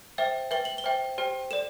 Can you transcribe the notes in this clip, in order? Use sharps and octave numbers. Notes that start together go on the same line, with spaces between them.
C5 E5 G5
B4 E5 G5 G7
F#7
G7
C5 E5 G5
G4 C5 G5
A4 D5 E7